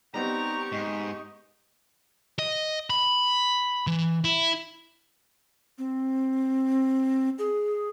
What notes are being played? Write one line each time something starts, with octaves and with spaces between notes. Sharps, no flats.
G3 B3 C4 D#4 G4 A#5 C#6
G#2 D#5
D#5
B5
E3
E4
C4
G#4